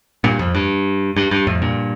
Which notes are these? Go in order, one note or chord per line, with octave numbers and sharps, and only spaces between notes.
G2 A#2
F2
G2
G2
G2
F2 A2
G2 A#2